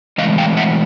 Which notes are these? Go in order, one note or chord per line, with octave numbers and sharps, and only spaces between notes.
A2 E3 G#3 D#5 F5
F5 G5
E5 F#5